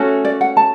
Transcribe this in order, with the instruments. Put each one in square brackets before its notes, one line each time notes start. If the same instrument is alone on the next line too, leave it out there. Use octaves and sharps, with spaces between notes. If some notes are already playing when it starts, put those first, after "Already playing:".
Already playing: [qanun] A3 C#4 F#4
[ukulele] D5
F#5
A5